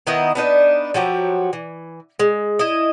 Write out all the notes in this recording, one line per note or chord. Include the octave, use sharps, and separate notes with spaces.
D#3 B3 E4 D#5
B3 D4 D#4 B4
F3 F#3 F#4 G4
E3
G#3
E4 D#5